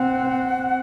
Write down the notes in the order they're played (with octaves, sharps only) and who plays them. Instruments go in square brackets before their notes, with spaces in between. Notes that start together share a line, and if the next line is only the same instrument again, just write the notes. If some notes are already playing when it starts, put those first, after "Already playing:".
Already playing: [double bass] C4 [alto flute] F#5